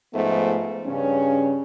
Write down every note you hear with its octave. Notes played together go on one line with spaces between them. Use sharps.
G#2 F3 A3 B3
G2 C#3 C#4